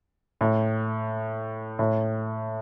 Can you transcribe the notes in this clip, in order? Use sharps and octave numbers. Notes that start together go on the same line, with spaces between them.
A2
A2